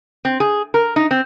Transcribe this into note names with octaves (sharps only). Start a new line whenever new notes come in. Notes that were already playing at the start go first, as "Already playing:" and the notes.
C4
G#4
A#4
D#4
C4